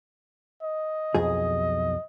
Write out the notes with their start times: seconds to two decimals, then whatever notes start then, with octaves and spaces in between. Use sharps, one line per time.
0.63 D#5
1.15 B1 F2 G#4